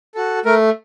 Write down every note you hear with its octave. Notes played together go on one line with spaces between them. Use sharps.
F#4 A4
A3 A#4